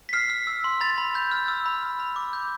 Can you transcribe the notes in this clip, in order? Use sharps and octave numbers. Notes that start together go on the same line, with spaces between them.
B6
F6 C7
F6
E6
C6
B5 A6
B5
B5 G6
F6
E6
B5
F6
B5
D6
G6